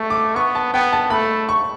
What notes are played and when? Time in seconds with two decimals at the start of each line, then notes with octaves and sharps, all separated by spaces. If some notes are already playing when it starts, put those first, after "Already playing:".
Already playing: A3 C#6
0.10 D6
0.35 B3 C#6
0.55 A5
0.74 B3 G5
0.93 A5
1.10 A3 B5
1.49 C#6